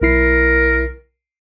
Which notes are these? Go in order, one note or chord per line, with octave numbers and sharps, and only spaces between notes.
B1 E4 A#4 C7